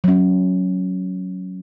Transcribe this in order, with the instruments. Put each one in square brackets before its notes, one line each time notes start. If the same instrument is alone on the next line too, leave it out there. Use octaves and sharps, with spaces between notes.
[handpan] F#3 C#4